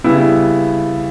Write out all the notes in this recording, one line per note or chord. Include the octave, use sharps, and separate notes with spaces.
C#3 G3 B3 E4